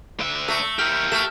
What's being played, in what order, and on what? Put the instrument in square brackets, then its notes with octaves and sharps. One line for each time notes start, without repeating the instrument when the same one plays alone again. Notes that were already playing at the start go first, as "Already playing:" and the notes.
[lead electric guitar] D3 E5
[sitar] A3 [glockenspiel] E6 A#6 C#7
[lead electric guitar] G4 A#4 [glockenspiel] F6
[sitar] A3 [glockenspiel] F6 G6 E7